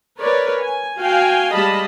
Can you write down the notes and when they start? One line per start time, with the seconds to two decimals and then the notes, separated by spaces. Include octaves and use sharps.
0.20 A#4 B4 C#5 D5
0.63 G#5
1.01 F#4 F5 G5 G#5
1.55 G3 G#3 D#5 F5 A5 B5